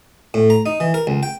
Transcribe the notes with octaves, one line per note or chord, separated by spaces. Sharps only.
A2
A#5
D#4
E3
A#4
C#2
G5